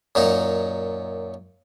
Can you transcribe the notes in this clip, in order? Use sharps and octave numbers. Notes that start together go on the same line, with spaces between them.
F#2 A#2 D#4